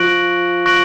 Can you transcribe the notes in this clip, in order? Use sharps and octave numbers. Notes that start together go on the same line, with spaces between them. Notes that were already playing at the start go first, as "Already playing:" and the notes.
Already playing: F3 C#6 F#6 A#6 D7 F#7
C#6 F#6 A#6 D7 F#7